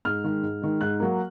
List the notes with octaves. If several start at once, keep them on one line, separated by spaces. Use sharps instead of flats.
G#2 F6
D#3 G#3
G#2
D#3 G#3
G#2 F#6
F#3 A#3